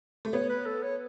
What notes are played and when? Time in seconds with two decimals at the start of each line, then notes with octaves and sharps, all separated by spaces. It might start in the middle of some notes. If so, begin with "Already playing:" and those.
0.25 A3
0.33 B3 C#5
0.49 B4
0.66 A4
0.83 C#5